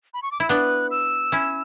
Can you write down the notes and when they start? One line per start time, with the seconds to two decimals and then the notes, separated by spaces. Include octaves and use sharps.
0.14 B5
0.22 C#6
0.32 D6
0.40 E4 E6
0.49 B3 D4 F#6
0.91 E6
1.32 C#4 E4